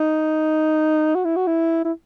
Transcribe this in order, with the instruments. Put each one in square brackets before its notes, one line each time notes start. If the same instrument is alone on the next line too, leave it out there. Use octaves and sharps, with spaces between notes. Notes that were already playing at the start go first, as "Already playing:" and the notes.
Already playing: [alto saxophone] D#4
F#4
E4
F#4
E4
E4